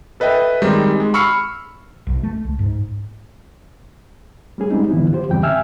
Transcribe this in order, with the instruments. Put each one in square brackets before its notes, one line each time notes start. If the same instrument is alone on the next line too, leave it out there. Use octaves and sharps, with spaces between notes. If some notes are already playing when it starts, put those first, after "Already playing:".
[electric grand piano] A4 B4 D#5 E5 G5
D#3 G3 G#3 C4 D#4
G#3
B5 C#6 E6 F6 C7 C#7
[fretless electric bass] B1
A3
C#2
G#2
[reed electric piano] G3 A3 C#4 G#4
G3 G#3 C4 D#4
G#2 D3 E3 F#3 B3 E4
F4 G4 C5
E2 G#2 C#3 G3 C4 G5
E5 G5 G#5 E6 F6